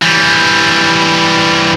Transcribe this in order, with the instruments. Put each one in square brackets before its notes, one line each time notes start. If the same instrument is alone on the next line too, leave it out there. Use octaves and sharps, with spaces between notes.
[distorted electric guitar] E3 G3